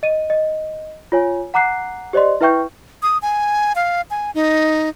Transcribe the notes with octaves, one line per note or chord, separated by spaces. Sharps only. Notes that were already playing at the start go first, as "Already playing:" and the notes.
D#5 D#7
D#5
F4 C#5 G#5
F#5 A#5 D6 F#6 C7
G4 C5 D5 D#5 C6
E4 B4 E5 G5 C#6 G6
D#6
G#5
F5
G#5
D#4